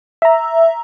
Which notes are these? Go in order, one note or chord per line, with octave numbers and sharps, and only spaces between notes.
E5 A#5